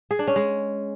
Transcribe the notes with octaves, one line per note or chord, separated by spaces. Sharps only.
G#4
D4
C#4
G#3